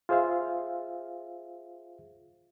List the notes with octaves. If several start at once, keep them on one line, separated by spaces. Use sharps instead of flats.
F4 G#4 C5 E5 F5